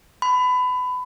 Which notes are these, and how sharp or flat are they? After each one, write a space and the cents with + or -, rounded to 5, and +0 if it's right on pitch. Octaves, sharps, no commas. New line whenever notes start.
B5 +25